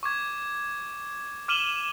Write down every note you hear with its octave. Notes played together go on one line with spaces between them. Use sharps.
C#6 D6 G#6
D6 F6 D#7 E7 F#7 G7